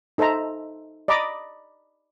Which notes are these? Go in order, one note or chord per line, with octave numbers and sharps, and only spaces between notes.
D#4 A4 C5 E5 A#5
D5 D#5 A#5 B5 D6 D#6